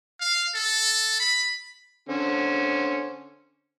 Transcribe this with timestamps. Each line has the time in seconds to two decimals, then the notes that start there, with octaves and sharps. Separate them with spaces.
0.21 F5
0.55 A4
1.20 B5
2.09 D3 C#4 C5